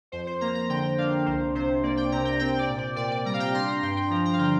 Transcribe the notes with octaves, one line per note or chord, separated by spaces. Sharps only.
F2 C5
C5
A#3 A#5
A#5
D3 G5
D4 F5
C2 C5
C3 C5
A#3 D5
G5
C3 A#5
G5
C4 G5
D5
A#2
D5
A#2 D5
D5
G3 A#5
F5
G5
D4 C6
A#5
G2 G5
G5
F3 A#5
A#5
F5
D3 G5